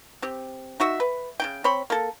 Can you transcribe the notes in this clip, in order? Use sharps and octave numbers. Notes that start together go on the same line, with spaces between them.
C4 G4
D#4 F#4 E5
B4
C#3 D#4 G5
C4 C#5 B5 C6
A#3 A4